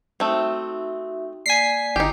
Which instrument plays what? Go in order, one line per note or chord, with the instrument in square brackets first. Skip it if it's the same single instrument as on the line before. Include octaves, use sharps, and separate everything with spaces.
[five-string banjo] A3 C4 [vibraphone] D#4 F#4 E5
[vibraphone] A#3 D5 [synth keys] G#5 B6 C7
[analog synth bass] G1 [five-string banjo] D#4 G4 [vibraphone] E4